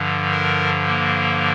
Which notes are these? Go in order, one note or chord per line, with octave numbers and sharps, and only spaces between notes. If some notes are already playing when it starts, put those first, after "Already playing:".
Already playing: G2 D3 F3
A#4
A#3